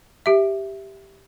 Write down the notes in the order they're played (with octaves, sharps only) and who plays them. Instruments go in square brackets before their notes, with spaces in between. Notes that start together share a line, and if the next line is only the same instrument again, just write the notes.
[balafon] G4 E5